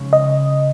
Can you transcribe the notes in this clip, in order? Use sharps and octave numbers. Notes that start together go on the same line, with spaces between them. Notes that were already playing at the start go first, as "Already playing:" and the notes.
Already playing: C#3 G#3 C#4
D#5